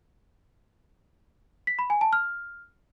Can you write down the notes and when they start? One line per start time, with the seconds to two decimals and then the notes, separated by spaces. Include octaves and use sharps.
1.67 B6
1.79 B5
1.90 G#5
2.01 A5
2.13 F6